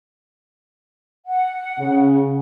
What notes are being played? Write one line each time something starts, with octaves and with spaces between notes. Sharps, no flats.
F#5
C#3